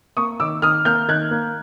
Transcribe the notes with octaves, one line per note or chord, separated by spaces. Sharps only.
A#3 C#6 D#6
D#3 D6 E6
D#3 D#6 F6
A#3 F6 G6
D#3 F#6 G#6
A#3